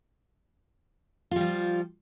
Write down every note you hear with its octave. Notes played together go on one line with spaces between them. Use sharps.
F3 G3 F4